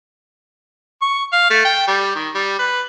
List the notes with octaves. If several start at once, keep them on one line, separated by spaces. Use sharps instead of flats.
C#6
F5
A3
G5
G3
D#3
G3
B4